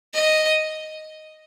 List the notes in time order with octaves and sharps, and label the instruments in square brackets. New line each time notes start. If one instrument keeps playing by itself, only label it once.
[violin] D#5